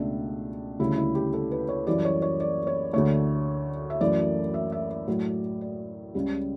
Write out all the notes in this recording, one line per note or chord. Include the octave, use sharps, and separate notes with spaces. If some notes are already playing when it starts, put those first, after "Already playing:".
Already playing: C#2 B2 A3 D4
D2 C#3 G3 E4
E4
G4
A4
B4
C#5
F#2 E3 G3 D5
C#5
C#5
D5
C#5
D2 D3 A3 C#5
E5
F#2 E3 A3 D5
E5
E5
D5
A2 F#3 A3
D5
C#2 C#3 G3